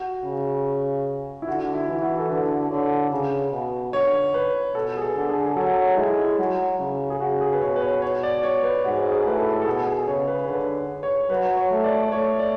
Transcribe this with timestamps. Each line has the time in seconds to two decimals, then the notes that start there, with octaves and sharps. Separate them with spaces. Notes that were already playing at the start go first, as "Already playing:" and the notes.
Already playing: F#4
0.24 C#3
1.42 E4
1.48 D3 F#4
1.74 E4
1.88 E3 E4
2.02 F#4
2.18 A4
2.29 D3 B4
2.70 D3 C#5
3.11 C#3
3.52 B2
3.93 D3 C#5
4.34 B4
4.75 B2 A4
4.97 G#4
5.02 A4
5.16 D3
5.29 G#4
5.46 G#4
5.56 F#3 A4
5.77 C#5
5.97 G#3 E4
6.18 E4
6.38 F#3 F#4
6.79 C#3
7.10 G#4
7.20 C#3 F#4
7.41 G#4
7.53 B4
7.62 B2 C#5
7.76 B4
7.82 C#5
8.02 C#5
8.23 D5
8.43 C#5
8.63 B4
8.84 G#2 F#4
9.11 G#4
9.25 A2 B4
9.39 A4
9.62 A4
9.66 B2 G#4
9.86 G#4
10.07 C#3 C#5
10.27 B4
10.48 D3 B4
10.75 B4
11.03 C#5
11.30 F#3 B4
11.57 C#5
11.71 A3
11.84 D5
12.03 D5
12.12 A3 C#5
12.39 D5